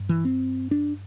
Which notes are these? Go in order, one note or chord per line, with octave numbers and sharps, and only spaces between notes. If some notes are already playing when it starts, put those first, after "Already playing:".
Already playing: G2
E3
C4
D4